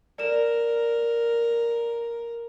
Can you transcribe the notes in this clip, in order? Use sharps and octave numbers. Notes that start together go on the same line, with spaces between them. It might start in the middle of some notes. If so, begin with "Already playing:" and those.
A#4 D5 E7